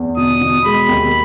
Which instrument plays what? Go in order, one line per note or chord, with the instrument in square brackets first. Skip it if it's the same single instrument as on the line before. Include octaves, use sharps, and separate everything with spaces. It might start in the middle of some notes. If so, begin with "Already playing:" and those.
Already playing: [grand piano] E2
[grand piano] B2 [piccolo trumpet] D#6
[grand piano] B2
[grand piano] G#3 [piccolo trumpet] B5
[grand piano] D#2